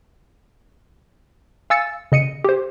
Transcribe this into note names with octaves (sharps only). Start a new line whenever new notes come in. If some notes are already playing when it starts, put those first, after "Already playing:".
F5 G#5 E6 A6 C#7
C#3 D#5 C#7 D#7
G4 C5